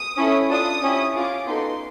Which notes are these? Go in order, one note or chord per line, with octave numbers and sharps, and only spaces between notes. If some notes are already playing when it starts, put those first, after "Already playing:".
Already playing: D#6
C#4 E4 A4
D4 F4 A4 D#6
C#4 E4 G4
C#4 F4 G#4 D6
B3 D#4 F#4 A4 C6